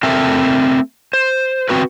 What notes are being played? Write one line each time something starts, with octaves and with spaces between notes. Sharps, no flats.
A3 C4 A4 A#4 E5
C5
C4 F#4 B4